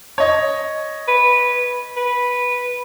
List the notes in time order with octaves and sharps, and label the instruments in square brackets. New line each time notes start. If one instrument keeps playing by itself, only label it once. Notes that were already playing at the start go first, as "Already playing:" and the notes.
[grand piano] C#5 D#5
[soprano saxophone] B4
B4